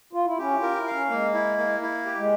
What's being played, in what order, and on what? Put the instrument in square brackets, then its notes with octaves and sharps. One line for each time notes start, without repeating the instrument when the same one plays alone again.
[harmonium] F4
E4
[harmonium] C#4 [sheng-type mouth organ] G4
[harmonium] E4
F4
[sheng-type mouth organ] A#4
[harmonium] E4
[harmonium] C#4 [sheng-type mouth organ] F5
[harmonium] G#3 [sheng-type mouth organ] A#3
[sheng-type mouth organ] E4
A#3
E4
G4
[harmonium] G#3